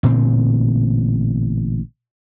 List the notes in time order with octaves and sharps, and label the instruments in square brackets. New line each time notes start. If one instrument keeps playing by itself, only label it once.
[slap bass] A1 A#2 D3 C4